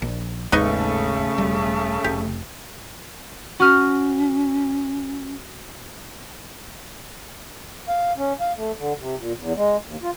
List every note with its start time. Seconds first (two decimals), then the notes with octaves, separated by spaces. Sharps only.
0.02 A#1
0.52 G#1 D#2 C#3 G#3 A3 B3 D#4 C#6
1.38 E1 G3
2.04 F1 G4
3.60 C#4 F#4 F6
7.88 F5
8.17 C#4
8.40 F5
8.57 A3
8.78 D3
9.00 C3
9.18 A#2
9.39 E2
9.56 G#3
9.86 D#2
10.02 F4